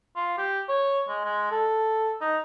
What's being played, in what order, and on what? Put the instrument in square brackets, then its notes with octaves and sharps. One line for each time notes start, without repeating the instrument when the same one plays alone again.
[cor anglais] F4
G4
C#5
G#3
G#3
A4
D#4